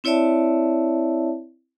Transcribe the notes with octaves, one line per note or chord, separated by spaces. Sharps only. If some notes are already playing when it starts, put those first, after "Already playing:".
C4 E4 C#5 D5 E5 A5